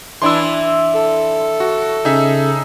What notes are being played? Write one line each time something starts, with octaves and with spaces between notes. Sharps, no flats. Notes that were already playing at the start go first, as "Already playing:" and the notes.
E3 D4 E4 C6 E6
A4
F#4
C#3 D#4 G#4 E5